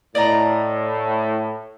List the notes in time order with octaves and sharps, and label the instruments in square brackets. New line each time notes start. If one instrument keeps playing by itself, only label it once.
[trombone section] A2 [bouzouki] D5 D#5 A#5